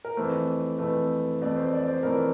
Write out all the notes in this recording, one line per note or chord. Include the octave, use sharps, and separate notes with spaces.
A#4
F2 E3 A3 C5
F2 E3 A3
F2 E3 A3 D5
C5
D5
D5
C5
F2 E3 A3 A#4